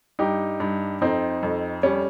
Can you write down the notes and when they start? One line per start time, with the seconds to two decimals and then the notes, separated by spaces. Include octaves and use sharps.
0.19 G2 D#4 G4
0.60 G2
1.01 F2 C4 D#4
1.43 F2
1.83 G3 C#4